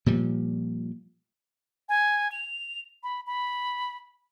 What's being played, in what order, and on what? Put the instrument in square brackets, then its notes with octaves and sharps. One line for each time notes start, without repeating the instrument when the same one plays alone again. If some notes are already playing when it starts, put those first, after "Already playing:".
[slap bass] A#2 F3 G3
[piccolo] G#5
F7
B5
B5